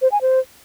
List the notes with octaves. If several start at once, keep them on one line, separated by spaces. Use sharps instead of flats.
C5
G#5
C5